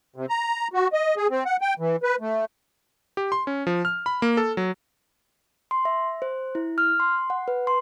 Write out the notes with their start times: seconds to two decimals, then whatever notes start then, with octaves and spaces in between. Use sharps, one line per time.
0.16 C3
0.29 A#5
0.74 F#4
0.93 D#5
1.17 G#4
1.30 C4
1.45 F#5
1.61 G5
1.79 E3
2.03 B4
2.21 A3
3.17 G4
3.32 C6
3.47 C#4
3.67 F3
3.85 F6
4.06 B5
4.22 A#3
4.37 A4
4.57 F#3
5.71 C6
5.85 E5
6.22 C5
6.55 E4
6.78 F6
7.00 C6
7.30 F#5
7.48 B4
7.67 C6